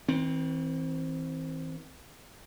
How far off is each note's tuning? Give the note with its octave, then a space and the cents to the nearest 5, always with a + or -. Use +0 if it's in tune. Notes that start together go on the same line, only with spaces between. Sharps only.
E3 -40 C4 +5